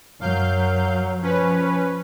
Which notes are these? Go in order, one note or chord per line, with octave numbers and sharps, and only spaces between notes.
F#2 F#3 F5 G6
F3 C#4 B4